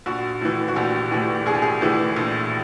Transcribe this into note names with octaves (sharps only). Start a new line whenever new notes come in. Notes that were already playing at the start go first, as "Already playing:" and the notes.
A#1 F#4
A2 E3
F#4
A#1 G4
A2 E3 G4
A#1 G#4
G4
G#4
A2 E3
A#1